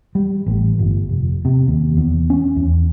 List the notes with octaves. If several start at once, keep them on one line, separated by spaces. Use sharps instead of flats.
G3
A1
G1
F1
C3
D#2
E2
C#4
E2